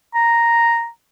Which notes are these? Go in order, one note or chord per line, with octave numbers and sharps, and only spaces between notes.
A#5